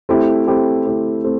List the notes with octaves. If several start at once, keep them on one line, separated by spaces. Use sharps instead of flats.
A3 C4 E4 G4
A3 C4 E4 G4
A3 C4 E4 G4
A3 C4